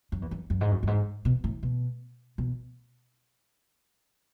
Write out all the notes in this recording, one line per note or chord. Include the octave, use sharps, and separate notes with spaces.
F#2
E2
F#2
F#2
G#2
F#2
F#2
G#2
B2
A2
B2
B2